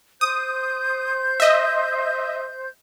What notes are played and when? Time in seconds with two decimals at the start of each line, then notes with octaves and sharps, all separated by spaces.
0.21 C5 D#6 G6
1.40 D#5 E5